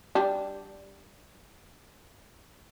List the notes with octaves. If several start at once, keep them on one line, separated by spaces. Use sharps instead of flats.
G3 D4